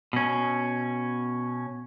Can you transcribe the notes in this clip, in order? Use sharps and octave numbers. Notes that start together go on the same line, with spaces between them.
B2 C#4